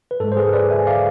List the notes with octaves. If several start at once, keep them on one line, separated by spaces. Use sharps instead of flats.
B4
G#2 G#3 A4
C5
G#4 B4
B4 D5
E5 G#5
D5 F5